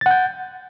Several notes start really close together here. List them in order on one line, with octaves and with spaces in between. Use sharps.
A6 F#5 G6